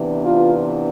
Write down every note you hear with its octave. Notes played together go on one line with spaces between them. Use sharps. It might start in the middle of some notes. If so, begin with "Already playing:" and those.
Already playing: C3 E3 B3 D4
F4